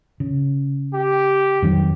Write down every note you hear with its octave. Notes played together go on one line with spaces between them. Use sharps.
C#3
G4
F2 D#3 F#3